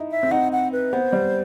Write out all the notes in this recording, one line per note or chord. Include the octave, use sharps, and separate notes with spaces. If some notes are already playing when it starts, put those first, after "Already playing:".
Already playing: D#4 E4
E5
C4
D#4 F#5
F#5
B4
B3 C5
G3